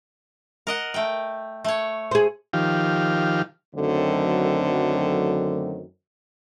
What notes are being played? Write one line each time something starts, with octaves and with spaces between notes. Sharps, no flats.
A#4 D#5 F#5
A3 G5
A3 C#5
G#4 C5
D#3 F3 G4 F5
F#2 D3 D#3 F#3 A3 C4